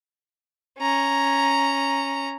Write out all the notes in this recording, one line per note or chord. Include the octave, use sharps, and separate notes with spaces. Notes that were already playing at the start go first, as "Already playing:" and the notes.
C#4 A#5